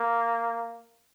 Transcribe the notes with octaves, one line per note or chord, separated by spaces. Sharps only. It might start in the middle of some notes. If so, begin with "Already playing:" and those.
Already playing: A#3